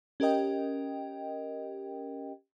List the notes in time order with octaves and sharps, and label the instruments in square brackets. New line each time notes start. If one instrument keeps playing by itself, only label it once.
[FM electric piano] C#4 G4 A#4 D#5 G5